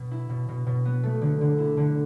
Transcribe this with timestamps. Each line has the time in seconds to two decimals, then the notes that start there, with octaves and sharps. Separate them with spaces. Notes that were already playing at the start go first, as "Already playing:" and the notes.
Already playing: B2
0.11 E4
0.29 B2
0.48 B2
0.67 B2
0.85 B3
1.03 A3
1.21 D3
1.41 D3
1.58 E4
1.77 D3